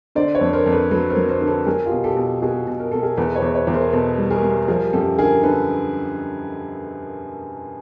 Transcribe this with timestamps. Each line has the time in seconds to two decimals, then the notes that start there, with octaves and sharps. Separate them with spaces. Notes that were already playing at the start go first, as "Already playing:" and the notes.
0.15 D3 C5 D5
0.35 B4 C#5
0.41 F2
0.53 A#4 C5
0.66 F2
0.72 A4 B4
0.91 F#3 A4 B4
1.10 A#4 C5
1.17 F#3
1.29 A#4 C5
1.41 D3
1.47 A4 B4
1.66 F#3 G#4 A#4
1.86 F4 G4
1.91 B2
2.04 G4 A4
2.17 B2
2.42 B2 F#4 G#4
2.67 B2
2.80 A#4
2.91 B2 A4
3.03 G#4 A#4
3.17 E2 A4 B4
3.36 B4 C#5
3.42 E2
3.55 B4 C#5
3.67 E2
3.74 A#4 C5
3.92 B2 A4 B4
4.18 G3
4.30 G#4 A#4
4.43 G3
4.68 F3 G#4 A#4
4.93 F#2 G4 A4
5.18 D3 G#4 A#4
5.43 D3 A4 B4